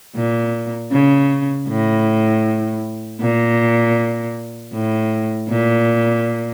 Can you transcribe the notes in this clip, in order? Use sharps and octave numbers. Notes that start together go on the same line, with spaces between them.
A#2
C#3
A2
A#2
A2
A#2